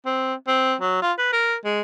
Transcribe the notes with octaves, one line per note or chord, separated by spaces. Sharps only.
C4
C4
F#3
F4
B4
A#4
G#3